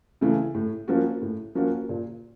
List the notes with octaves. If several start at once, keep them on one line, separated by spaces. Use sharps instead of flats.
C#3 E3 A3
A2
F3 A#3 C#4 F#4
A2
F3 A#3 C#4 F#4
A#2